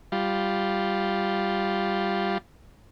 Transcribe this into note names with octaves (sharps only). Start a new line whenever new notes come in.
G3 F4